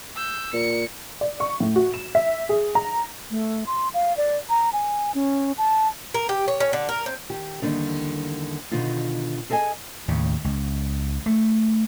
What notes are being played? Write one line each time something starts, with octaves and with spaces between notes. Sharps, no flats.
E6 G6
A#2 C#7
D5
C#6
A2
F#4
E7
E5
G#4
A#5
A3
C6
F5
D5
A#5
G#5
C#4
A5
A#4
G4
C#5
C#4
D3
A#4
C4
D#3 G4
E2 D3 D#3 G3 A#3 D4
B2 D3 D#3 D#4 F4
G#4 A4 D#5 G5 G#5
D#2 A2 C#3
C#2
A3